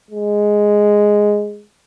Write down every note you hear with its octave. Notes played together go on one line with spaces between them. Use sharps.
G#3